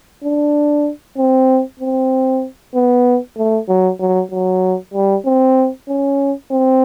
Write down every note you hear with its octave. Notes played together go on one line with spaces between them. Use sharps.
D4
C4
C4
B3
A3
F#3
F#3
F#3
G3
C4
C#4
C4